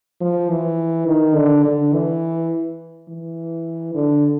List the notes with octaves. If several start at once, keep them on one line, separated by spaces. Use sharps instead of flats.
F3
E3
D#3
D3
D3
E3
E3
D3